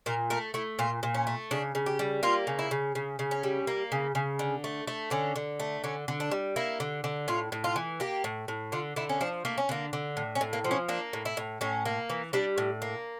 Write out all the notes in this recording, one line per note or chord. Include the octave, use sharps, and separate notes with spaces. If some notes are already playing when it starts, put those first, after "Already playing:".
A#2 A#4
A3 A#4
A3 E4
A#2 F4
A#2
C#4
A3
C#3 D4
C#3
G4
G3
A#3 F4
C#3
E4
C#3
C#3
C#3
C#4
G3
A#3
C#3
C#3
D3
A3
A3
D3 C#4
D3
A3
D3 C#4
D3
D4
G3
A#3 E4
D3
D3
A2 F4
A2
F4
E3
A#3 G4
A2
A2
D3 F4
D3 E4
C#4
F3 D4
A3 A#3
C#4
D3 A#3
D3
A2
C#4
A2
A#3
F3
C#4
A#3 D4
A2
E4
A2
A2 C#4
A#3
E3
G3 D4
A2
A#3